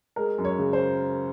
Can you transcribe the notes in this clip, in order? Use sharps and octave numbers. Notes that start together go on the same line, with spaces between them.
G#3 A#4
F#2
C#5
C#3
C5